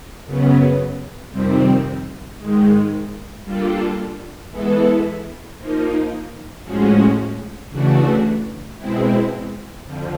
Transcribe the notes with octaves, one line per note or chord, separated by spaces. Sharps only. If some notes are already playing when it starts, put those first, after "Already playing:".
F#2 C#3 F#3 B3
F2 C3 D#3 G3 C4
G#2 D#3 G#3
G3 A#3 D4 F4 A4
E3 G#3 B3 E4 A4
F3 A#3 D#4
A2 F3 G#3 C#4 F#4
C#3 E3 A3 D4 F#4
B2 G#3 C4 E4
F2 D3 F3